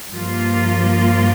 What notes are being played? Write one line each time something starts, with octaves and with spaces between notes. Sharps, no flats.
G2 F3 A#3 F4